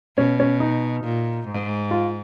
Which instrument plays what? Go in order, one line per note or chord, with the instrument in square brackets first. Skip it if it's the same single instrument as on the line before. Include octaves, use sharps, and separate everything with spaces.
[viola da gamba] B2 [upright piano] C#4
[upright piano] C#4
D#4
[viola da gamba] A#2
G#2
[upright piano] F4